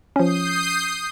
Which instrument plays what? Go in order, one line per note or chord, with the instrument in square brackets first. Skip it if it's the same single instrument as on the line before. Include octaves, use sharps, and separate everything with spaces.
[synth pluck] F3 C#4 [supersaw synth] D#6 G6 C7